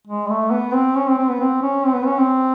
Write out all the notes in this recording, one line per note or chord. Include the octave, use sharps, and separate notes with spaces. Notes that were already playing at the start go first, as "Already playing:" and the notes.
G#3
A3
B3
C4
C#4
C4
C4
B3
C4
C#4
C4
B3
C#4
C4